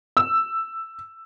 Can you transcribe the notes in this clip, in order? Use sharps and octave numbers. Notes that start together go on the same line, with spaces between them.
E6